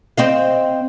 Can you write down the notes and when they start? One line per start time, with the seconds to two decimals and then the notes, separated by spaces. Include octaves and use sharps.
0.17 C4 D#5 F5